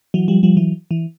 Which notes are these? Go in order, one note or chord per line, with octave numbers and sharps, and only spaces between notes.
E3 F#3
F3 G3
F3 G3
E3 F#3
E3